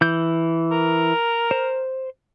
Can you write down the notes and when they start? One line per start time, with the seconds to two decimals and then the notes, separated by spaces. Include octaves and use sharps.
0.01 E3 G6
0.72 A#4
1.51 C5